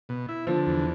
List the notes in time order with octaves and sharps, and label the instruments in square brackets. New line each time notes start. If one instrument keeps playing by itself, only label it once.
[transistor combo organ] B2
E4
[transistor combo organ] D3 [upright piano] F3
[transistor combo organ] E2